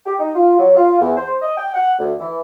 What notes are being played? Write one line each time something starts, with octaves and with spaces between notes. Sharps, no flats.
G4
D#4
F4
F#3
F4
E2
C5
D#5
G5
F#5
D2
E3